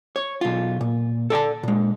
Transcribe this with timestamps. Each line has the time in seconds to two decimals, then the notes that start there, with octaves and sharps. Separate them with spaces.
0.16 C#5
0.41 B1 F4
0.81 A#2
1.30 A4 D5 G#5 A5
1.63 A#2 G#3